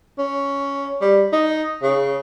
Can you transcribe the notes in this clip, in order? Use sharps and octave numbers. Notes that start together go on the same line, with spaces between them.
C#4
G3
D#4
C#3